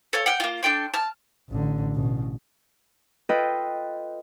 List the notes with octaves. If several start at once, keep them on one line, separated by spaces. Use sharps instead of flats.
A4 C#5 F5
F#5 G5 F6
A#3 F4
D4 A4 G5 C6
A5 F6
A1 D3
A1 B2
F4 A4 B4 D#5 G5